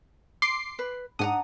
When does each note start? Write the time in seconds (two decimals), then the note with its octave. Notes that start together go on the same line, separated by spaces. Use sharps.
0.42 C6 D6 C7
0.79 B4
1.19 G#2 D4 F#5 A#5 D#6